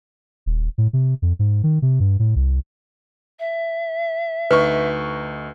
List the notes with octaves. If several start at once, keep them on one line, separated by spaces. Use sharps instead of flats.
D#1
A2
C3
F2
G#2
D#3
C3
G2
A2
C2
E5
D2 D#4 B4 C#6